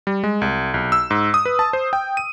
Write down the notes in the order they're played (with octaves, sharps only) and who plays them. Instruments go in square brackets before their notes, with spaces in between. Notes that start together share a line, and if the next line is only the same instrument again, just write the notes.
[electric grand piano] G3
G#3
C2
B1
E6
G#2
D#6
B4
A5
C5
G5
D#7